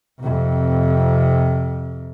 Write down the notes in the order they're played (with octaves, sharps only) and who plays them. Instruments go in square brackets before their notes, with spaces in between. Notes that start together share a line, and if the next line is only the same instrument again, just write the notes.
[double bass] F2 C3